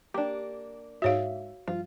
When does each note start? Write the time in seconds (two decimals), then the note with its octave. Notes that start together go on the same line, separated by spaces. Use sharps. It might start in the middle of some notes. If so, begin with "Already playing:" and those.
0.14 A#3 D4 G4
1.02 G#2 F#4 C#5 E5 F5
1.68 G2 F3 F4